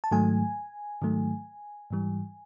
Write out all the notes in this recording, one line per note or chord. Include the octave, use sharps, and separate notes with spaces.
A5
G#2 D#3 F#3 A3 G#5
G#2 D#3 F#3 A3
G#2 E3 G3